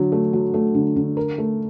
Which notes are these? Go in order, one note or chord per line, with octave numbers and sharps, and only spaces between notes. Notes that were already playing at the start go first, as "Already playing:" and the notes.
Already playing: D3 F#3
A3
F#3
A3
D3
D3
A#4
A3